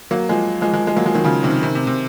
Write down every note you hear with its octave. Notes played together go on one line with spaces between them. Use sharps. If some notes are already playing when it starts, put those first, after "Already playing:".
F#3 A#3
F3 G#3
F3 G#3
F3 G#3
F3 G#3
F#3 A#3
F3 G#3
D#3 F#3
C#3 F3
C3 D#3
C3 D#3
C3
C3